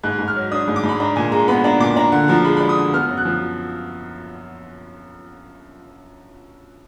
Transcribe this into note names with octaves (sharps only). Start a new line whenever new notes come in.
G#2 F#6
G#2
F6
F#3
D4 D#6
G#2
D6
G#2
B5
D4 A#5
A#2 G#5
G#3 A#5
B3 B5
D4 A#5
A#2 D6
D4 A#5
D3 F#5
F3 A#5
G#3 B5
B5
D4
D#6
D3
B3 F6
F#2
F#6
F3